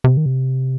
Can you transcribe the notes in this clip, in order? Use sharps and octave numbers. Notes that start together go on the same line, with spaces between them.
C3
D#3
C3